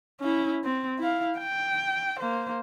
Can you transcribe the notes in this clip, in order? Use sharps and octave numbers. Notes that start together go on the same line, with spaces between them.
C#4 E4
C4
E4 F5
G5
A#3 C5